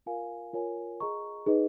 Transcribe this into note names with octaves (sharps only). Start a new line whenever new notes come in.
F4 A#4 F5 G#5
F4 A#4 C#5 G#5
G#4 D#5 A#5 C#6
D#4 G#4 B4 D#5